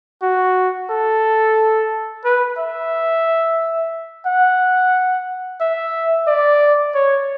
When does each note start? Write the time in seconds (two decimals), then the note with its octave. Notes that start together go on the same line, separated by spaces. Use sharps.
0.22 F#4
0.90 A4
2.25 B4
2.58 E5
4.26 F#5
5.61 E5
6.27 D5
6.94 C#5